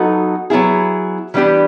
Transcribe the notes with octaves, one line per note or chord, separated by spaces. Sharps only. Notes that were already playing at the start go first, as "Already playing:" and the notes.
Already playing: F#3 B3 D#4 F#4 A4
F#3 B3 E4 G#4
E3 G3 B3 D4 G4